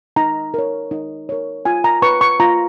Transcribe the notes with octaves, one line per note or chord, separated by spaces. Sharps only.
D#4 A#5
A#4 C#5
D#4
A#4 C#5
F4 G#5
A#5
B4 C#6
C#6
F4 A#5